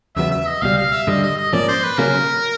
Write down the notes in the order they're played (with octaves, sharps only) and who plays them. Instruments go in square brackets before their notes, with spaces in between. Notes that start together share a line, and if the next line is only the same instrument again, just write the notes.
[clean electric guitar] E2 C#3 F#3 B3 [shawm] E5
[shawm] E5
D#5
[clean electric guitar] C#2 B2 G3 [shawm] F5
[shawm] F5
E5
[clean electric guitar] G2 D3 G3 [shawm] D#5
[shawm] D#5
D#5
[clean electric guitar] G#2 F3 A#3 C#4 [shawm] D5
[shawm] C5
B4
[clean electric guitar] C#3 F#3 A#3 C#4 [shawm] A#4